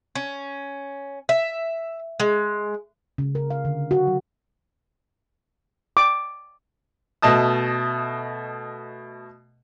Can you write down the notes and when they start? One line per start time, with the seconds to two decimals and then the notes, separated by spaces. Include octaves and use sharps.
0.15 C#4
1.29 E5
2.20 G#3
3.18 C#3
3.35 A#4
3.50 F5
3.65 D3
3.91 F#4
4.07 F#3
5.97 D6
7.22 B2 A3 D#5 A5 D#6